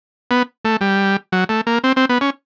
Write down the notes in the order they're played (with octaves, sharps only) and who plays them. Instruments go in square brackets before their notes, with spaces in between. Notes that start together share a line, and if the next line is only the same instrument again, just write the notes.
[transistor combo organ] B3
A3
G3
F#3
A3
A#3
C4
C4
B3
C#4